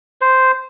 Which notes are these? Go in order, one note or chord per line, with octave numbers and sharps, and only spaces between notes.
C5